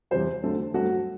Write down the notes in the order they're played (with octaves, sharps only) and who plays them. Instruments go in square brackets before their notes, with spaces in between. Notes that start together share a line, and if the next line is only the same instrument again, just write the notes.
[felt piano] E2 C3 E3 G3 C4 C5
D2 D3 A3 C4
G2 F#3 A3 C4 F#4